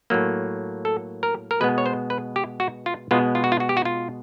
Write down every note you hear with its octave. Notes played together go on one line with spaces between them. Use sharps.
A2 F#3 A#3
A4
A#4
A#4
B2 G#3 B3 B4
C#5
C5
B4
G4
F#4
F4
B2 G#3 B3 F4
F4
F#4
F4
F#4
G4
F#4
F4